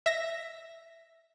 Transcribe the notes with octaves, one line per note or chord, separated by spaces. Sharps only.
E5 A#6